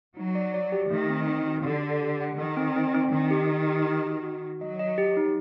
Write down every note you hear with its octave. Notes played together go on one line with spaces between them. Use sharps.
F#3 D#4
D5
D5
G4
D#3 A3
C4
C4
F#4
D3 G4
D5
G4
F#5
D#3 A4
C4
C4
C4
D#3 D4
G4
G4
G4
D#4
F#4
F#4
F#4
F#3 D#5
D#5
G4
D#4